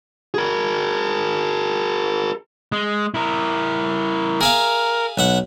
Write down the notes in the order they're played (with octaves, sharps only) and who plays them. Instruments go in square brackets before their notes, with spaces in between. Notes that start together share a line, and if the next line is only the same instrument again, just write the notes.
[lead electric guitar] G#4 A#4
[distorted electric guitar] G#3
E4 A#4
[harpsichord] G#4 E5 F5 [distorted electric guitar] A#4
[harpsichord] B1 E5 F#5